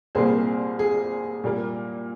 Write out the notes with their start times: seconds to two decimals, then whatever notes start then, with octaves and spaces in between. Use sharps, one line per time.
0.15 C2 A#2 G3 A#3 G#4 C5
0.79 G#4
1.44 A#2 G3 A#3